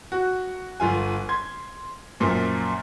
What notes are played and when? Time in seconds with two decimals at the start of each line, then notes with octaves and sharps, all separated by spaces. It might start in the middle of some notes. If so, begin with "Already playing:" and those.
0.12 F#4
0.80 G1 F4 G#5
1.29 C6 G#6
2.20 F#2 A#2 F3